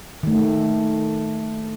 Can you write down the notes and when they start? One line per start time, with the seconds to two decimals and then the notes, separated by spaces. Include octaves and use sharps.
0.23 D#3 A3